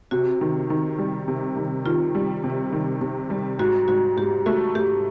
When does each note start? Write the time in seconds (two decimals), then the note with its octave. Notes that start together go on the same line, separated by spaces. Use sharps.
0.11 C3 F#4
0.41 D#3
0.70 D#3
0.99 G3
1.28 C3
1.57 D#3
1.86 D#3 F4
2.15 G3
2.44 C3
2.73 D#3
3.01 C3
3.30 G3
3.59 G#2 F#4
3.88 G#2 F#4
4.17 G#2 G4
4.46 A3 F#4
4.75 A3 G4